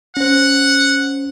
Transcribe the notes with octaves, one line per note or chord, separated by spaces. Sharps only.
C#4 C5 F#5